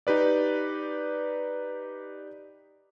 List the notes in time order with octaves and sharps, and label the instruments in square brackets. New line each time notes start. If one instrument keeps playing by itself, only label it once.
[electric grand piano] D#4 G4 B4 D5